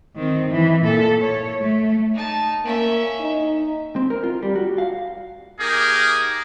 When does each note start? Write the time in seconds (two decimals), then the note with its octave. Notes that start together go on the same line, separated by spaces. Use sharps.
0.15 D#3 C4
0.51 E3
0.84 A#2 A4
1.21 C#5
1.61 A3
2.13 D#4 A5
2.65 A#3 C#4 E5
3.20 D#4
3.96 C4
4.10 A#4
4.23 F4
4.43 G3
4.55 F#4
4.78 F5
5.61 A#3 D#4 G4 G#4 A#4